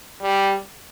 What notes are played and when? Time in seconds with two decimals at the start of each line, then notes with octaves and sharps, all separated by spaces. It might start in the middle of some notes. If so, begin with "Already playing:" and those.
0.22 G3